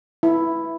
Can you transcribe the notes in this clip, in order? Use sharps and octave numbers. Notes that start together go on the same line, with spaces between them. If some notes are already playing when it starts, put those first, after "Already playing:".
E4